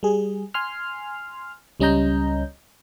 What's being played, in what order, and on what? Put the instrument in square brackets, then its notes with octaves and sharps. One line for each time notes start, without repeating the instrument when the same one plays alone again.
[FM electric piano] G3 G#4
G#5 C6 F6
C#2 G3 C#4 D#5 A#5 G6